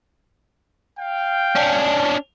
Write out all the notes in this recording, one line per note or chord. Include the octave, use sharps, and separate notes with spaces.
F5 G5
C#4 D4